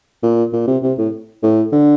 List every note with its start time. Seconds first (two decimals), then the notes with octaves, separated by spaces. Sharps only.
0.23 A#2
0.53 A#2
0.67 C3
0.83 C3
0.98 A2
1.43 A2
1.73 D3